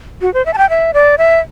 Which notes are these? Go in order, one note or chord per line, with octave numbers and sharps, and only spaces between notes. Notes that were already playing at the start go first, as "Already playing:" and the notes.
F#4
C5
E5
A5
G5
E5
D5
E5